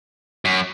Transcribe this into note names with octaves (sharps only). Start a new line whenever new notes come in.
F#2